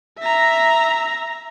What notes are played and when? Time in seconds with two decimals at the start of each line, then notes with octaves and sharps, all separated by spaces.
0.19 E5 A#5